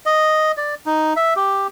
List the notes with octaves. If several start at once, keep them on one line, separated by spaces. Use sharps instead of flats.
D#5
D5
D#4
E5
G4